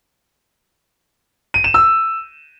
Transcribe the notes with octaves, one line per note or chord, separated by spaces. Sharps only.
D#7
E7
E6